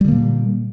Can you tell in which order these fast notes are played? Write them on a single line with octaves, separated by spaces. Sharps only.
G3 D3 A#3 A#2